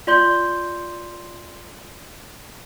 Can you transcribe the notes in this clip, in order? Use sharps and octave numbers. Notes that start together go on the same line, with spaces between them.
F4 D5 C6 G6 G7